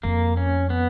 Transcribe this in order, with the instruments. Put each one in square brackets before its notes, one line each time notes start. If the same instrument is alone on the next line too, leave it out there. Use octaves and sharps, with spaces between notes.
[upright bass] F2 [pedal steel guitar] A#3
[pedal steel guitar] C#4
B3